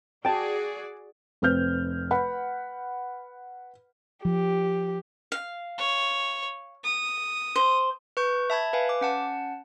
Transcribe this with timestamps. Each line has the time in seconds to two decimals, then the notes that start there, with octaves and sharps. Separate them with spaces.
0.25 F#4 G#4 D5 G5 A5
1.42 F1 C4 B4 F6 G6
2.11 B4 F#5 B5
4.25 F3 G4
5.32 F5
5.78 C#5
6.84 D#6
7.56 C5
8.17 B4 C#6 G6
8.50 E5 A5 B5 G#6
8.73 B4 F5 G#5
8.89 D6
9.01 C#4 F#5 A5